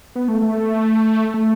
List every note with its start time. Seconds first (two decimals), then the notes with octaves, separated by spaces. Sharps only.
0.16 B3
0.28 A3
0.42 A3
1.34 A3